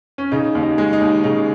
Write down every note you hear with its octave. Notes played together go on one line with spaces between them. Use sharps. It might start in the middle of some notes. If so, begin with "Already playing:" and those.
C#4
C#3 D#4
D#2
D#4
G#3
D#4
D#2
C#3 D#4